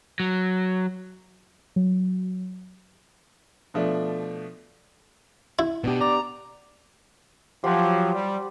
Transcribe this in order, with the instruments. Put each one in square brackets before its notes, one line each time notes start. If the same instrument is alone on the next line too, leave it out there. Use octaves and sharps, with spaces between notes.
[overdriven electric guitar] F#3
[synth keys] F#3
[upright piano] B2 F3 A3 D4
[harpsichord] E4
[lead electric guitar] B2 [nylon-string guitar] B3 D4 G4
[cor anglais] D5 [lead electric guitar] A#5
[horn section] F3 F#3 [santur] G4 C5 F#5
[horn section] G3